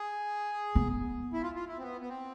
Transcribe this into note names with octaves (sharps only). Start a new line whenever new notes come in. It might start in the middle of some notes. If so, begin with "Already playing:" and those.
Already playing: G#4
B3
E4
F4
F4
E4
C4
B3
B3
C4